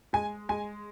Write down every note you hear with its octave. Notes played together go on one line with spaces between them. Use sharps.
G#3 G#5
G#3 G#5